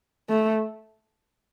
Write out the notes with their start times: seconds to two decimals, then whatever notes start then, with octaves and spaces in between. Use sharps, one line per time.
0.29 A3